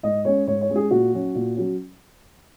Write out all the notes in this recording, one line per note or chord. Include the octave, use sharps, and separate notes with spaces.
G#2 D#5
G#3 C#4 C#5
G#2 C#5
C#5
G#3 C#4
G#4
A#2 F#4
F#3 C#4
A#2
F#3 C#4